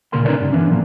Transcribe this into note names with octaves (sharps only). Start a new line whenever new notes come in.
D2 A#2 C#3 A#4 C6
C#4 D#4 A#4 B4 C#5 D5
G2 C#3
E3 B3 C#4 D4
A2 F3 A#3